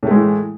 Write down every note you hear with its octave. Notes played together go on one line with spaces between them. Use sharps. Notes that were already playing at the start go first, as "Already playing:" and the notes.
A2 E3 G#3 A3